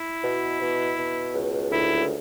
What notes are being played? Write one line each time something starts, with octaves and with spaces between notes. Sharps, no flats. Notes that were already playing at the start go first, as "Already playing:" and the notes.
Already playing: E4
B2
B2
B2
C#2
D2 E4